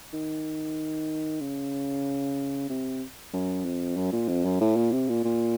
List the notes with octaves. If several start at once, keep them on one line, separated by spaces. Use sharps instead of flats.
D#3
C#3
C3
F#2
F2
F#2
A#2
F2
F#2
A2
A#2
C3
A#2
A#2